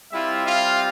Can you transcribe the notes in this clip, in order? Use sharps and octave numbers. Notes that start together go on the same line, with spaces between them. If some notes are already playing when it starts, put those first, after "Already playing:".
G3 C4 E4 F4 E5
F4 F5